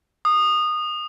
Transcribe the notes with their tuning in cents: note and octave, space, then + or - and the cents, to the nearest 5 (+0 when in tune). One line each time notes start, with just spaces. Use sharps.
D#6 -20